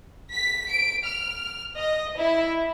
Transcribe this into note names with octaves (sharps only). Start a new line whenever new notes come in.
B6
D7
F6
D#5
E4